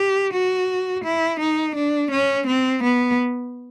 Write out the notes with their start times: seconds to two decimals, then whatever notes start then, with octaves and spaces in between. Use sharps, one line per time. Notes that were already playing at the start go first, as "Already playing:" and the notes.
Already playing: G4
0.33 F#4
1.04 E4
1.40 D#4
1.75 D4
2.11 C#4
2.47 C4
2.83 B3